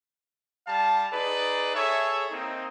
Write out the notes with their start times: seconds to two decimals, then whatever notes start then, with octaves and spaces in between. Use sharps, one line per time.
0.66 G3 F5 A5
1.11 D#4 G#4 B4 D5
1.73 G#4 A4 C#5 E5
2.30 A#3 C4 D#4